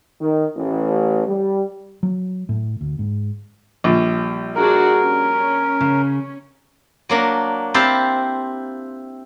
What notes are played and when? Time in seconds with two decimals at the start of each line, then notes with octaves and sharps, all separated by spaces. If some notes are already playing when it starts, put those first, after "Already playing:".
0.20 D#3
0.55 A1
1.28 G3
2.03 F#3
2.49 A2
2.81 D2
2.99 G#2
3.84 A#1 G3
4.55 D4 F#4 G#4 A#4
5.01 C#4
5.81 C#3
7.09 F#3 A#3 D4
7.74 C4 E4 G4 C5 F5 A5